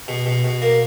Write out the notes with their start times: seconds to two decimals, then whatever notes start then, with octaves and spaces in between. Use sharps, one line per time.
0.08 B2
0.26 B2
0.44 B2
0.62 A#3